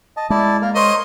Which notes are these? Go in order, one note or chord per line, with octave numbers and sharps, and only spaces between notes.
D#5 A5
G#3 E4 D5 A5
A#3 A#4
A#4 C5 C#5 D#5 C6